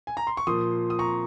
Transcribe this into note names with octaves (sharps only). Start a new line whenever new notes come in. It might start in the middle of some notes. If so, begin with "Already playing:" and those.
G#5
A#5
C6
C#6
A#2 F3 A#3 C6 D#6
D#6
A#5 C#6